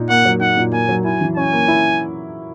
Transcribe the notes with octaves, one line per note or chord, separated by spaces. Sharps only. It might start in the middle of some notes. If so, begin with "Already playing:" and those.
Already playing: A#2 D#4
A#3 F#5
F#3
D#4 F#5
A#2
A#3 G#5
F#3
E4 G#5
E3
C#4 G#5
A#3
E4